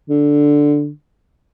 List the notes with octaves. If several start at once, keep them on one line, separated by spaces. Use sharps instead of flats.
D3